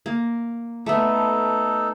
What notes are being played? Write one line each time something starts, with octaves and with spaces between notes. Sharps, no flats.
A#3
A3 B3 D#4 A4